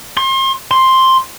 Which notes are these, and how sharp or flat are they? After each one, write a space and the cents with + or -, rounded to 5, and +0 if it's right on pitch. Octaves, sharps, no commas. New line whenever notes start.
C6 +35
C6 +5